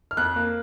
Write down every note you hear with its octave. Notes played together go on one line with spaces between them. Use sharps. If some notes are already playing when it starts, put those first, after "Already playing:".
F6
F2 F#6
A#3